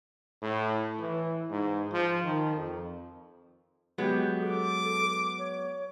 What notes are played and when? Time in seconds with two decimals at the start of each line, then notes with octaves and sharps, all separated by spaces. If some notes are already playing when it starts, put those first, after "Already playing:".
0.42 A2
1.00 E3
1.50 G#2
1.92 F3
2.24 D#3
2.56 F2
3.98 F#3 G#3 B3 G4
4.40 A4 D6
5.38 C#5